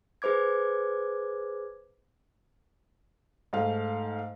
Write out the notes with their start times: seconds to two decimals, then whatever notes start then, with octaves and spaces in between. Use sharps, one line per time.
0.22 G#4 B4 C5 D6 G#6
3.53 G#2 A3 F5